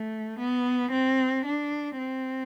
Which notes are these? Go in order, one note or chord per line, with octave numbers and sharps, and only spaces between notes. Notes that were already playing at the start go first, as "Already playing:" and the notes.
Already playing: A3
B3
C4
D4
C4